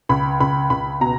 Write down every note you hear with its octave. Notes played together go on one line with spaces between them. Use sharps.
C#2 B5
C#2 B5
C#2 B5
B2 A#5